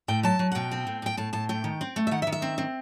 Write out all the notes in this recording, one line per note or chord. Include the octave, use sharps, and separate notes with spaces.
A2 G5
F#3 A5
F#3
F#5
B2 G5
C4
A2
A2 G5
A2 A5
A2 A5
A3 G5
D#3
C4
A3
E5
D#3 F#5
E5
D#3
E5
C4
C4